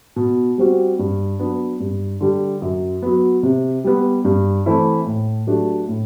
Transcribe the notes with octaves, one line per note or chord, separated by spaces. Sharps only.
B2
G3 C4 F#4
G2
F#3 B3 D4
G2
D3 G3
F#2
F#3 B3
C3
G3 B3
G2
E3 A3 C4 E4
A2
F#3 A3 D4 G4
A2